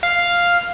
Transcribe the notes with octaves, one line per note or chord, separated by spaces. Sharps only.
F5